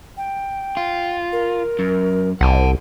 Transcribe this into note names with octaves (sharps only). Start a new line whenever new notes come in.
G5
F4
A#4
F#2
C2 F#5 A5